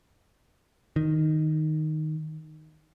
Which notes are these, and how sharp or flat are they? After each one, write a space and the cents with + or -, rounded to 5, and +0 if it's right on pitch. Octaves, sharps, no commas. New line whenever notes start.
D#3 -5